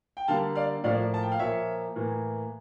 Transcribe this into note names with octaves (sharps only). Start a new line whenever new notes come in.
G5
D3 G3 A#3 F5 A5
D5 F5
A2 F3 A#3 D5 F5
A5
G5
F5
A#2 F3 A#3 C#5 E5
A2 E3 A#3